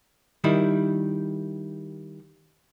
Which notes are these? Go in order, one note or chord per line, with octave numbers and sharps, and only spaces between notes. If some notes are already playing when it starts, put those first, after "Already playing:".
D#3 G3 E4